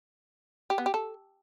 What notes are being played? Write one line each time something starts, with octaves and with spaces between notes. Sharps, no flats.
G4
B3
G4
A4